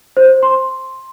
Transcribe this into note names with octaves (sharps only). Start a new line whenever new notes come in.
C5
C6